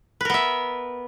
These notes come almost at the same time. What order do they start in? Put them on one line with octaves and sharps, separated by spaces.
B4 A#4 B3 E5